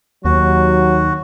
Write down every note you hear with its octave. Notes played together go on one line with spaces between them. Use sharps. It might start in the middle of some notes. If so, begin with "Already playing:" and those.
D#2 F#3 F#4